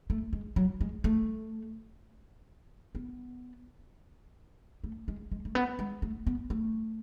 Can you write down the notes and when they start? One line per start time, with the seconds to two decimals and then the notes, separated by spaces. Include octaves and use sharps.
0.10 A3
0.33 G#3
0.56 F#3
0.81 G#3
1.04 A3
2.95 B3
4.84 A3
5.08 G#3
5.32 G#3
5.45 A3
5.55 B3
5.79 G#3
6.02 A3
6.27 B3
6.50 A3